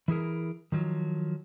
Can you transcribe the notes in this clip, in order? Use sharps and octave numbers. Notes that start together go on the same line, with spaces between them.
E3 E4 G#4 A#4
D#3 F3 F#3